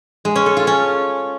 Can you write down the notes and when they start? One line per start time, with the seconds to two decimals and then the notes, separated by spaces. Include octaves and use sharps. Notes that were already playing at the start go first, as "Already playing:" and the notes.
0.25 G#3
0.36 C#4
0.46 A4
0.57 F4
0.67 C#4